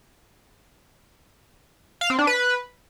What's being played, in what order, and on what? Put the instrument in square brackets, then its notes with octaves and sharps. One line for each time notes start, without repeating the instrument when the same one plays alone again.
[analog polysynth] F5
C4
D4
B4